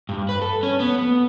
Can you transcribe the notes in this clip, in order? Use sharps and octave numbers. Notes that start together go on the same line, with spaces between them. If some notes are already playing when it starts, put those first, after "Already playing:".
G2
B4
A4
C#4
B3
B3